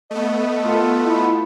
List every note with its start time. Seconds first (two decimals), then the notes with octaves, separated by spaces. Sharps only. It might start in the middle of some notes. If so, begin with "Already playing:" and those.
0.11 A3 B3 D#5
0.65 F4 A4
1.04 E4 D#5